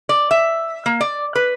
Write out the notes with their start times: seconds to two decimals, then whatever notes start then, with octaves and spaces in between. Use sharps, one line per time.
0.09 D5
0.31 E5
0.86 A#3
1.01 D5
1.35 B4